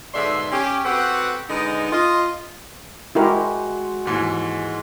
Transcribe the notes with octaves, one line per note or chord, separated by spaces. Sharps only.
G#2 B2 D3 D5 E5 C6
C#4 G4
C4 F#4 G4 A4 B4 F#5
D3 G#3 B3 D#4
F4 D#5
G#3 E4 F#4 G4 A#4 C5
D#2 G#2 E3